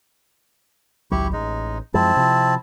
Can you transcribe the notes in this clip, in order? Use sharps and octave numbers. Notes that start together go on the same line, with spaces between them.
G#1 C#2 F#3 E4 G4 C#6
A1 G#3 D#4
F#2 F3 G#3 C4 E4 A5
C3 F3